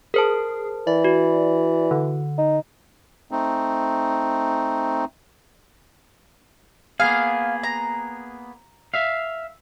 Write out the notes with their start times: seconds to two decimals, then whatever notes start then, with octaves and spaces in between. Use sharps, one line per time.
0.14 G#4 A#4 C5 A5
0.87 E3 D5
1.04 F#4
1.91 D3
2.38 D#4
3.31 A3 C4 D#4
7.00 A#3 B3 G#4 F5
7.63 A#5
8.94 E5 F5